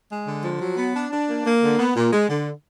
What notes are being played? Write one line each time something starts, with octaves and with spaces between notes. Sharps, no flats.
G#3
D3
F3
F#3
B3
D4
D4
A#3
A#3
D3
B3
A#2
G#3
D3